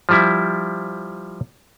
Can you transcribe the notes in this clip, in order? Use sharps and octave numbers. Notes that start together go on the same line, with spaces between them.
F3 G3 E4